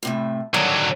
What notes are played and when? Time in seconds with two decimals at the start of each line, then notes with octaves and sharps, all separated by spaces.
0.03 A2 C3 A3
0.54 D3 D#3 F#3 G3 C#5